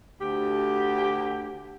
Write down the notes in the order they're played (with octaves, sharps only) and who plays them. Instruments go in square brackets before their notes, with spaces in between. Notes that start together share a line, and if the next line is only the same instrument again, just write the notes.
[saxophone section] D2 G4